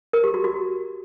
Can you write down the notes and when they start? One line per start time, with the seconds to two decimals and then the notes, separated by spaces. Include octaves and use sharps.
0.13 A#4
0.24 G4
0.34 F#4
0.44 F#4